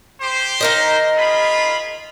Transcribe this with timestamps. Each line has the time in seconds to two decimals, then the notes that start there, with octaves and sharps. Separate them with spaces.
0.22 G4 C5
0.61 D#4 A#4 D#5
1.17 F4 G#4 B5